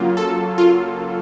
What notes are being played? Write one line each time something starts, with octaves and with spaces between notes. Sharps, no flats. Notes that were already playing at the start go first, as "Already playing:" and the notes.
Already playing: C#3 F#3 A#3 F4
A4
F4